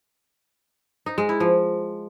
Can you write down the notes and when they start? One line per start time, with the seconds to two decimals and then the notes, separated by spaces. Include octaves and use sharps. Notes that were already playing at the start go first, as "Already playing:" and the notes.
1.06 D#4
1.18 G#3
1.29 E4
1.40 F3